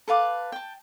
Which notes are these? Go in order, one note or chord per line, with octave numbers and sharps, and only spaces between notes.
A4 B4 F5 D6
G5 A5